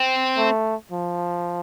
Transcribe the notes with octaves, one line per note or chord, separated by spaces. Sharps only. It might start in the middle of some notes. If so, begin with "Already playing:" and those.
Already playing: C4
A3
F3